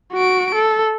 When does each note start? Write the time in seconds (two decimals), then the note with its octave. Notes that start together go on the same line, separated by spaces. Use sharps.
0.13 F#4 D7
0.55 A4